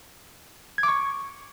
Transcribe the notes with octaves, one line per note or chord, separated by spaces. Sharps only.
G#6
D6
C#6